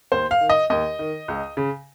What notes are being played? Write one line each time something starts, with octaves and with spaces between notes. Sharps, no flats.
D#2 C5
F5
D#3
D#5
D#2 D#5
D#3
C#2
C#3